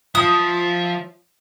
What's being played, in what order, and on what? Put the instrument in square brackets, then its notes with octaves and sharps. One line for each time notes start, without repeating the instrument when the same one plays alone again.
[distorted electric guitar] F3 [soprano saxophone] E5 [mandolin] D#6